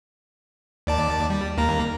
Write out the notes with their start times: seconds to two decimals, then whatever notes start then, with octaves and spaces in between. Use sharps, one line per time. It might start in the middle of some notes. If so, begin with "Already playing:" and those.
0.87 D#2 D5 A5
1.30 G3
1.57 D#2 A#3 A#5